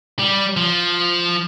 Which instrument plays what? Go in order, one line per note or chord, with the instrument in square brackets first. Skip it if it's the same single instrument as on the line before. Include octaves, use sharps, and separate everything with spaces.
[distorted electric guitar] G3
F3